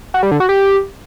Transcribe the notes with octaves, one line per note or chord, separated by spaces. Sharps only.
F#4
G3
D3
F#4
G4